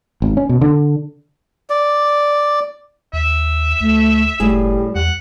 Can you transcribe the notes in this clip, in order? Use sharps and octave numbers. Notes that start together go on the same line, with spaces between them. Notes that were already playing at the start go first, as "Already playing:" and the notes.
G#1
C#4
B2
D3
D5
D#2 E5
D2 A3
F#1 A2 G3 G#4
E2 F#5